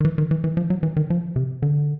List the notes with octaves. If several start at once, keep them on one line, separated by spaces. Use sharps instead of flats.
D#3
E3
D#3
E3
E3
F3
F#3
E3
D#3
F3
C3
D3